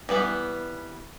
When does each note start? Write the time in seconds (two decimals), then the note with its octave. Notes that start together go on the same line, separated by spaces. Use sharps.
0.09 E3 G3 B3